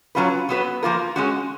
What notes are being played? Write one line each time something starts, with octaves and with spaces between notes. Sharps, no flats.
F#3 C#4 F4 B4
F#3 B3 F#4 B4
F3 A#3 F4 A#4
G#3 C#4 F#4